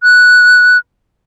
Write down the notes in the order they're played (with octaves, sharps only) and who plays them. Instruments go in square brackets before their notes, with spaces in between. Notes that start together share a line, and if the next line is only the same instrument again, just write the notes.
[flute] F#6